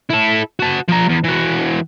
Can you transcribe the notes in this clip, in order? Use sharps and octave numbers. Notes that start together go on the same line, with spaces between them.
E4 A4
F#4 A5
F3 A#5
E2
E3 F#4